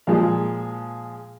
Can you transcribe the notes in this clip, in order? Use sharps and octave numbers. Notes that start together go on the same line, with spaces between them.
A#2 F3 G#3 F5